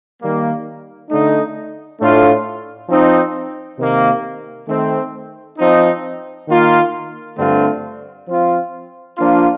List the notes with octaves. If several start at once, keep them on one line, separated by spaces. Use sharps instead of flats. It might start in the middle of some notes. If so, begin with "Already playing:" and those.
D#3 G3 A#3
D3 A3 D#4
A2 A3 D4 F4
F3 C4 D#4
C3 D#3 A#3
D#3 A3 C4
F3 C4 D#4
D#3 A#3 F4
G2 D3 A3 C4 F4
F3 C4 F4
F3 A#3 D4 F4